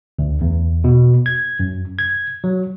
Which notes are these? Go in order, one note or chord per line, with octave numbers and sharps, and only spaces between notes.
D2
E2
B2
G#6
F#2
G#6
F#3